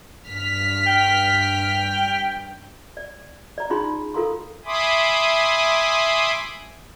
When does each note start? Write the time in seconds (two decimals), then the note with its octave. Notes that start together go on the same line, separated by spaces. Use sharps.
0.27 G2 F6 B6
0.87 G5
2.97 D5
3.58 D5 A#5
3.70 C#4 D#4 F4 G#4 B5 C6
4.14 F4 A4 A#4 F5 A#5 C6
4.65 E5 G#5 B5 C6 D6 D#6